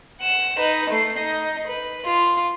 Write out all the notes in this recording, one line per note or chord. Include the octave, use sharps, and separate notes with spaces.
F#5 E7
D#4 B4
A3 C7
D#4 D#5
B4
F4